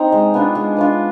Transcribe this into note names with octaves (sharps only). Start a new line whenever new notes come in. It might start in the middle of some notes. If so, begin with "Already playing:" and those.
Already playing: C4 D#4
G#3
B3 D4 F4
G#3
B3 D4 F4